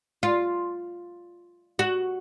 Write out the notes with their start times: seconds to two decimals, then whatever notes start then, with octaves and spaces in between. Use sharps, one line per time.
0.23 F4
1.79 F#4